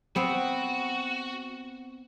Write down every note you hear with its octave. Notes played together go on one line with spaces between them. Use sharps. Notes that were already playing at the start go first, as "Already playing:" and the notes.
B3 C4 F#4